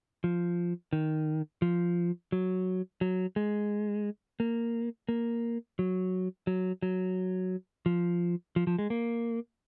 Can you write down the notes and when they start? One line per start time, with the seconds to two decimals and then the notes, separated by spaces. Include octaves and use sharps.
0.24 F3
0.93 D#3
1.62 F3
2.32 F#3
3.01 F#3
3.36 G#3
4.40 A#3
5.09 A#3
5.79 F#3
6.47 F#3
6.82 F#3
7.86 F3
8.56 F3
8.67 F3
8.78 G#3
8.90 A#3